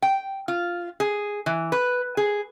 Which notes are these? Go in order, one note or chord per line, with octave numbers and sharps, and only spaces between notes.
G5
F4
G#4
E3
B4
G#4